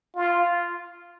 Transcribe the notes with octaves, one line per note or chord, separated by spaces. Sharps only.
F4